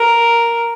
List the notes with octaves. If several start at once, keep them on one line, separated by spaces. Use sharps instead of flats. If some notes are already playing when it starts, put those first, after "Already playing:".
Already playing: A#4